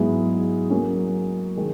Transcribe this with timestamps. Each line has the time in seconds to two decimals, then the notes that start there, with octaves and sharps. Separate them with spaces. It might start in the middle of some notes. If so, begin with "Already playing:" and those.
Already playing: G#2 F#3 B3 E4 G#4
0.70 F#3 A#3 C#4
1.57 D#3 G#3